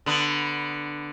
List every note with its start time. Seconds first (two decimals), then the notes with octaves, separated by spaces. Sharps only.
0.06 D3 B3